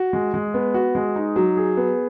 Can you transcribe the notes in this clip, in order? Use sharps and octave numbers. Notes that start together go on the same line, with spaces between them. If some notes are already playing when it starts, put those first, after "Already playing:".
Already playing: F#4
G#3
G#3
B3
F#4
G#3
D#4
F#3
G#4
B3